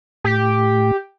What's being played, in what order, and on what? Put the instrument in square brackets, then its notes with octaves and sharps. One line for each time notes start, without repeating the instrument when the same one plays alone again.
[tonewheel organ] A2 [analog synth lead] G4